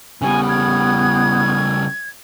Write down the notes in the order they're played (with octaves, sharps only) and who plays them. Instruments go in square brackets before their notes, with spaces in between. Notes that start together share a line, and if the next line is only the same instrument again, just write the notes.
[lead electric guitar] C#3 G3 [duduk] B3 [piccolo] G#5
[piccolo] G#6